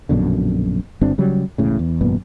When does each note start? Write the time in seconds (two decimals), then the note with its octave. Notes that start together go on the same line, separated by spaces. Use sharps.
0.09 A#1 F#2 B2 D3
1.01 G1 G2 C4 D4
1.18 C#3 F#3 G3
1.58 E1 A2 C#3
1.79 E2
2.01 G#1 F#2 A#2 B3